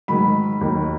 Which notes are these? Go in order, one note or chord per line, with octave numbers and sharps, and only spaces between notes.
G#2 D#3 F#3 B5
D#2 D#3 F#3